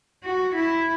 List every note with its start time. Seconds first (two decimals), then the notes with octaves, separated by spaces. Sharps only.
0.24 F#4
0.55 E4